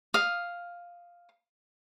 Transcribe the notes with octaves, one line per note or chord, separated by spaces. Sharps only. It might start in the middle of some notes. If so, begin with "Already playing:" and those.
F5 D#6